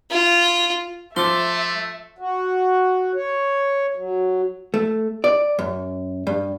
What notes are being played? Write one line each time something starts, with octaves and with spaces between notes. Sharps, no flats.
F4
F3 A3 E5 C6 D6
F#4
C#5
F#3
A3
D5
F#2
G2